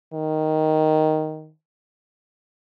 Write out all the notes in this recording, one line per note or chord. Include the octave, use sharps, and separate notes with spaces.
D#3